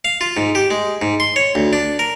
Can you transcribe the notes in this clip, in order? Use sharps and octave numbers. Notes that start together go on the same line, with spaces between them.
F5
F4
G#2
G4
G#3
G#2
C6
C#5
D2
D4
A#4